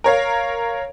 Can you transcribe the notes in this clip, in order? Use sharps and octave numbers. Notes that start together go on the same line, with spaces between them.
A#4 C#5 F5